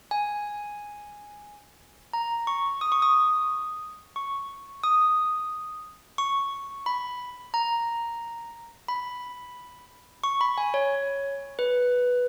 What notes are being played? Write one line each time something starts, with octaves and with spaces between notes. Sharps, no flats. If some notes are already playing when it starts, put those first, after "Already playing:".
G#5
A#5
C#6
D#6
C#6
D#6
C#6
D#6
C#6
B5
A#5
B5
C#6
B5
G#5
C#5
B4